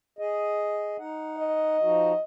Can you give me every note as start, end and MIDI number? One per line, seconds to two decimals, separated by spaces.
0.19 0.97 68
0.19 0.97 75
0.99 1.77 63
0.99 1.77 78
1.38 2.23 75
1.82 2.13 53
1.82 2.13 63
1.82 2.13 66